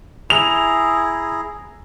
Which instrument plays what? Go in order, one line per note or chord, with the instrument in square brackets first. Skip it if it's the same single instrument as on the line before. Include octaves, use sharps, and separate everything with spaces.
[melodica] E4 G#4 A#5 [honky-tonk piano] F7